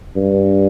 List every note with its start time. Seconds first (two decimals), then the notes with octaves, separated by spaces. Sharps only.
0.16 G2